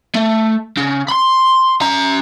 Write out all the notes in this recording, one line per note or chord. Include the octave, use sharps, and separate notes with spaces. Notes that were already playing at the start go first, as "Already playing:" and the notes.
A3
C#3
B5 C6
C#4 A#5